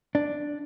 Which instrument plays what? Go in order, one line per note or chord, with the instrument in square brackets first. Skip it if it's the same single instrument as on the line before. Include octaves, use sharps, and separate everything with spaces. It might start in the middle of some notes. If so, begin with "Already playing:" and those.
[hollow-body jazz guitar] D4